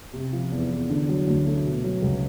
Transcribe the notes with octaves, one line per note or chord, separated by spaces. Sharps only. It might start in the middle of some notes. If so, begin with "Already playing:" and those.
C3
F3
E2
E2
D3
F#3
D2
A3
B2
F#3
C#2